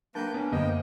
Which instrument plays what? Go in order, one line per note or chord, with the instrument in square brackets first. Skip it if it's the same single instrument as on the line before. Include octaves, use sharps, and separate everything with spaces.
[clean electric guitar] F#3 D4 [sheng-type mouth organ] A#3 B4 G6 [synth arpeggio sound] A5 A#5
[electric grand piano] B3 [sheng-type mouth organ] C#4 [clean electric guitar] D4 G#5
[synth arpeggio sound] F#2 D3 [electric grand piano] A#3 D#5 [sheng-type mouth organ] B3 G5 [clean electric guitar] G4 C5